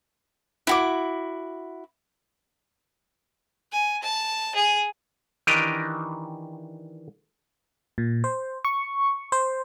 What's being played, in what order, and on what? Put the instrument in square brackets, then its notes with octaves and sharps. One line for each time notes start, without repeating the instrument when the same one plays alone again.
[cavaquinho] E4 F#4 D6
[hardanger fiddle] G#5
A5
G#4
[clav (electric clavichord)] D#3 E3 D4 G4 A#4 D#5
[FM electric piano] A#2
C5
C#6
C5